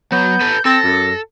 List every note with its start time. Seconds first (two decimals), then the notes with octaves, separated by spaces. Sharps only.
0.12 F#3 B3 G6
0.41 A4 B4
0.65 C4 A4 A#6
0.84 F#2